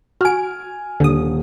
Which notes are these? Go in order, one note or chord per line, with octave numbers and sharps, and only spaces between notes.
F#4 G#5 F6 D7
D#1 D3 D#6